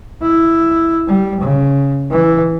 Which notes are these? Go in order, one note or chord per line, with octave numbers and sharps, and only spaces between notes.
E4
G3
C#3
E3